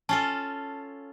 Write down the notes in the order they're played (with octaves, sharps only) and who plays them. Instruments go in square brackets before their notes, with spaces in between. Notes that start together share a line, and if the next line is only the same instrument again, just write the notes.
[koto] C#4 F4 A4 [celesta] A5